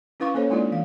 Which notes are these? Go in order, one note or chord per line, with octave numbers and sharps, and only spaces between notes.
C#4 E4 B4 F5 C#6 D6
A#3 C#4 A4 C5 C#5
G#3 A#3 D4 E4 F4 D5
E3 F5